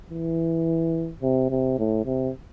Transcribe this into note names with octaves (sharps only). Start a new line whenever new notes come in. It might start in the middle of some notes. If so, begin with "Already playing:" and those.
E3
C3
C3
A2
C3